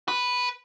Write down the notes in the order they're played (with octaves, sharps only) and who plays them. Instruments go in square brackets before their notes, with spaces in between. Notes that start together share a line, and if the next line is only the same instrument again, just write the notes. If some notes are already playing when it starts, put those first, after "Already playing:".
[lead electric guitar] B4